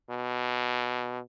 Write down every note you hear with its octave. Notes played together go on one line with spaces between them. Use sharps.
B2